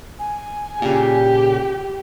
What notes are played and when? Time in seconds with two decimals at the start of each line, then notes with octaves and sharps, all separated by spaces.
0.19 G#5
0.82 A#2 C#3 G4